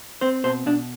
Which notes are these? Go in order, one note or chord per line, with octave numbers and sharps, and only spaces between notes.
C4 C5
B2 C5
B2 D4